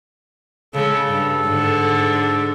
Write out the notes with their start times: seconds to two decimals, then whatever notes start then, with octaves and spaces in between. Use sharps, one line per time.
0.74 C#3 G#3 A4
1.08 G2
1.48 G#2 D3